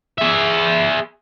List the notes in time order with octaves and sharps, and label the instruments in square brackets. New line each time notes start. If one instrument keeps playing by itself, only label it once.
[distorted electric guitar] G#4 E5